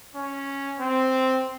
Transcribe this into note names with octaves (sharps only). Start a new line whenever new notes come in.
C#4
C4